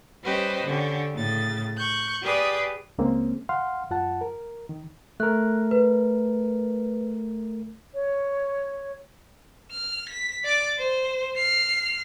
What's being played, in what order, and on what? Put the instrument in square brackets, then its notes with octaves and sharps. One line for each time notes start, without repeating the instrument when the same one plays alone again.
[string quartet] G3 C#4 G4 B4 C5 D#5
D3 C#4 G4
A2 C#3 A6
C#6 F#6 G6
G4 G#4 B4 D5 D#6
[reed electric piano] C#2 G#3 A#3 C4 C#4
F5 F#5 C6 F6
F#2 F4 F#5 A5
A#4
D#3
[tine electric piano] A3 A#4 [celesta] F#6
[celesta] B4
[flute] C#5
[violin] F6
B6
D5 D6
C5
F6 C7